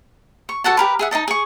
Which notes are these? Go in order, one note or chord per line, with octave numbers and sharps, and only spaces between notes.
C#6
F#4 A4 F#5 A5
G4 A#4 B4
G#4 E5 F#5
D#4 G#4 D#5 A5
G#4 C#6